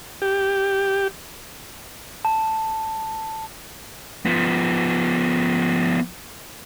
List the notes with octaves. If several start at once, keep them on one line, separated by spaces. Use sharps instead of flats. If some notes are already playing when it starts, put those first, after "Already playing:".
G4
A5
F3 B3